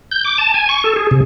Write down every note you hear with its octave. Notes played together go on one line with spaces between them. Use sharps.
G6
D6
A5
G#5
C#6
A4
G#4
C3